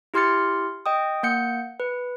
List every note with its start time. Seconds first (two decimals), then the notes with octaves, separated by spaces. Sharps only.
0.14 E4 G4 C6 F6 A6 C#7
0.86 D#5 G5 D#6
1.23 A#3 F#5 G6 C#7
1.80 B4